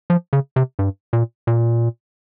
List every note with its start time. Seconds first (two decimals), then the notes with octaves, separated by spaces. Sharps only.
0.10 F3
0.33 C#3
0.56 C3
0.79 G2
1.13 A#2
1.47 A#2